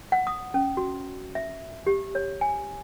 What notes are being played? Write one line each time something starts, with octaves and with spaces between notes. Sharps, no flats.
F#5
D#6
C#4
F#4
E5
G4
C#5
G#5